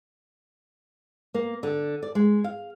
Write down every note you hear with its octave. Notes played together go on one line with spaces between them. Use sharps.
A#3
D3
D5
G#3
F5